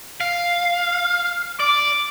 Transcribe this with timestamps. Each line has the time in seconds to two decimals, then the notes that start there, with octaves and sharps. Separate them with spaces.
0.21 F5
1.60 D5 D6